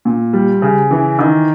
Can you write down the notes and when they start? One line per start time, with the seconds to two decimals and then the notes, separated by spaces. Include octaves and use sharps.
0.05 A#2
0.33 G3
0.62 C#3
0.91 E3
1.19 D#3